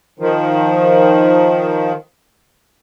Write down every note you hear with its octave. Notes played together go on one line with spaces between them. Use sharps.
D#3 F3